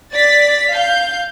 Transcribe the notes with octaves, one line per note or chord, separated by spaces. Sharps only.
D5 A6 B6
F5 G6